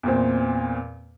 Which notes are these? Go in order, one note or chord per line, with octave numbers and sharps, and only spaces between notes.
E2 A#2 C4